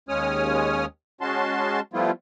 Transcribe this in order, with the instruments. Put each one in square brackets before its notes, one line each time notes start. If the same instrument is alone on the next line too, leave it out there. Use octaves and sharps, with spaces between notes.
[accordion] D#2 G#3 C#4 C#5 D#6 F6
G#3 C#4 F#4 A5 C6
F3 G3 A3 B3 E4 F4